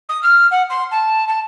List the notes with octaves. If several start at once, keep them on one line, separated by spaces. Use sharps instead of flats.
D#6
F6
F#5
C6
A5
A5